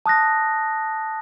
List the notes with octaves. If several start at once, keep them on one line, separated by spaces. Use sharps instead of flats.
A5 D#6 F#6 A#6